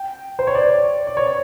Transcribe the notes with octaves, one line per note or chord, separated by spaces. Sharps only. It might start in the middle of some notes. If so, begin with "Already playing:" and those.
Already playing: G5
C5
C#5
D5
D5
C#5